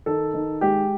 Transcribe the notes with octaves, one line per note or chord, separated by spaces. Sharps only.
D#3 A4
D#3
G#3 G4